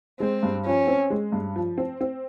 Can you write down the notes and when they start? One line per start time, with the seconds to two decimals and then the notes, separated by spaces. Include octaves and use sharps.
0.20 G#3 C4
0.43 G2
0.65 F3 C#4
0.87 C4
1.10 G#3
1.32 G2
1.56 F3
1.78 C4
2.01 C4